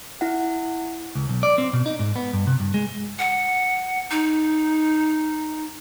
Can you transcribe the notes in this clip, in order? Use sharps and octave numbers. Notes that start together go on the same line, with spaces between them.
E4 F#5
C#2
B1
D5
C4
B2
D#4
G#2
B3
G2
C3
G2
G#3
F#5
D#4